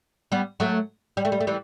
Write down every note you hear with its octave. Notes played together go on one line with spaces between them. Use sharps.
G3 B3
F#3 A3
G3
A3
G3
A3
E3 G3